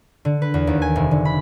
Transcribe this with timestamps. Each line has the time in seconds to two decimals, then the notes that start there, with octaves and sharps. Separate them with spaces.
0.25 D3
0.42 B4
0.54 E2
0.67 D#2
0.82 G#5
0.96 F1
1.11 D3
1.25 B5